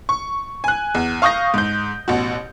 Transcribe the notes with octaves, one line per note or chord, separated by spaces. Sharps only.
C#6
G#5 F#6
E2
F5 C#6 D#6 G6 A#6
G#2 G6
A1 B2 F#4